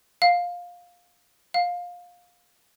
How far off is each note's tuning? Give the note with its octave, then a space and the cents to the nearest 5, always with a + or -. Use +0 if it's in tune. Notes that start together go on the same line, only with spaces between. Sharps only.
F5 +15
F5 +20